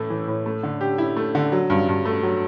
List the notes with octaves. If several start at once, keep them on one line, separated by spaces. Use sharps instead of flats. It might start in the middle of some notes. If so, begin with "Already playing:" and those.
Already playing: A2 E3 A3 E4
E3
A2
A3
D3
G4
E4
A3
D3
F#3
G2
G2
A3
F#3